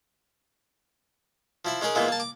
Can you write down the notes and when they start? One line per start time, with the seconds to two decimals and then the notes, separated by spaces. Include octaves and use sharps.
1.65 F3 E4 E5
1.81 G#3 C#4 D#4 G#4 A#4
1.95 A#2 E3 G#3 A#3 B3 D#4
2.09 A#3 A5
2.20 D6